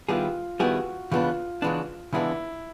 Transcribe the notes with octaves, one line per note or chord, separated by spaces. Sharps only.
D#3 G3 B3 E4 F4 G#4
D#3 G3 B3 E4 F#4 G#4
C#3 E3 G#3 B3 D4 F4
C#3 E3 G#3 B3 D4
C#3 E3 G#3 B3 D4 E4